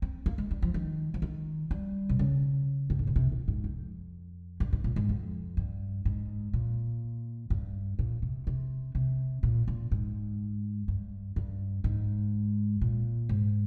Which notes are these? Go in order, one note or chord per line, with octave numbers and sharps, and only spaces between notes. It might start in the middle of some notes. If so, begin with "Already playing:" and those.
C4
A#3
G#3
G3
F3
D#3
F3
D#3
G3
C3
C#3
G2
G#2
A#2
C3
A#2
G#2
F2
G2
G#2
A#2
G#2
F2
G2
G#2
A#2
G2
A#2
C3
C3
C3
A#2
A#2
G#2
G2
G2
G#2
A#2
G#2